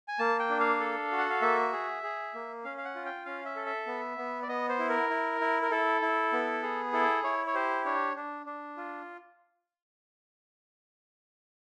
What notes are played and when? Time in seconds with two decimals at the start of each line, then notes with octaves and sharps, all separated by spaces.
0.08 G#5
0.19 A#3 A5
0.39 G5
0.50 D4
0.60 F5
0.80 A4
1.12 F#4
1.18 F#5
1.30 F5
1.42 A#3 E5
1.72 G#4
2.03 G#4
2.34 A#3
2.64 C#4 F5
2.77 F5
2.85 F#5
2.95 F4
3.05 G5
3.25 C#4 F5
3.45 E5
3.56 A4
3.66 E5
3.86 B3
4.18 B3
4.42 D5
4.48 B3 D#5
4.69 C5
4.79 E4
4.89 A#4
5.10 E4
5.41 E4
5.62 A#4
5.71 E4 A4
6.02 E4
6.33 B3
6.63 G#4
6.93 E4 A4
7.24 E4 C#5
7.46 C#5
7.54 G4 C5
7.85 D4 C#5
8.16 D4
8.46 D4
8.77 F4